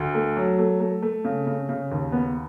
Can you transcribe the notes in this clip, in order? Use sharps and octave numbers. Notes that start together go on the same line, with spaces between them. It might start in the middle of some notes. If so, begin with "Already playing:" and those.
Already playing: D2
A3
F#3
A3
A3
A3
C#3
C#3
C#3
D#2
B3